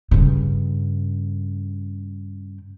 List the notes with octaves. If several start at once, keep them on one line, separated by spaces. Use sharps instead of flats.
G2 C#3